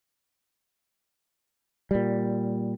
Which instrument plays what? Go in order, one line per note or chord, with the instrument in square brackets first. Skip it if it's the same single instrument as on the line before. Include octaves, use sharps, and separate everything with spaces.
[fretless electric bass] A#2 G3